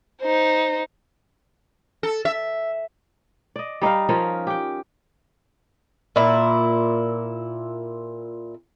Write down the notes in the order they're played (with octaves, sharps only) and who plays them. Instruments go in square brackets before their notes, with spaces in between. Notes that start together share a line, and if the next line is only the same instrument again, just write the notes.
[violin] D#4 C5
[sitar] A4
E5
[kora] D5 D#5
G3 D#4 D#5 F5
F3 C#4 F4 A#4
G4 G5
[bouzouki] A#2 E4